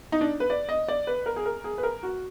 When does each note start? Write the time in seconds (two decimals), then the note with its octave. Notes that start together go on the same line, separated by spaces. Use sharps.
0.12 D#4
0.21 D4
0.40 B4
0.50 D5
0.69 D#5
0.88 D5
1.07 B4
1.26 A#4
1.36 G#4
1.46 A#4
1.64 G#4
1.78 B4
1.83 A#4
2.03 F#4